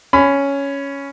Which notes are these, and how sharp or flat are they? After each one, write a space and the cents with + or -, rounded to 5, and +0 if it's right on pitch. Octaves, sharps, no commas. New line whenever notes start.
C#4 +5 B5 +20